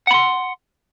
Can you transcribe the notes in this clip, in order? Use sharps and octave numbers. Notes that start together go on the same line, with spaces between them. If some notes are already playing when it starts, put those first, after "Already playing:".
F#5 B5 C6